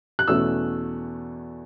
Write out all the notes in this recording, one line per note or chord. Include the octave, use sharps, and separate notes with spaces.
F#6
E2 B2 A3 C#4 E6